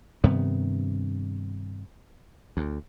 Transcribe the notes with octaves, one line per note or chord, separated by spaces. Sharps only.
G2 C3 D#3 B3
D2